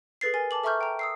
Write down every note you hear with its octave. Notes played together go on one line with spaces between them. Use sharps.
G#4 A4 B4 A6 C7
A#4 G#5 A6
A5 D6 F#7
A4 E5 A#5 C#6 F6 G6
G5 A#5
D#6 E6 C7